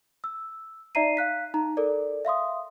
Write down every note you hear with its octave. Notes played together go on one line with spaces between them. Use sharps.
E6
D#4 D5 E5 A#5 C7 D#7
F5 F#6 B6
D#4 A#5
A4 A#4 D5
E5 F5 C6 D#6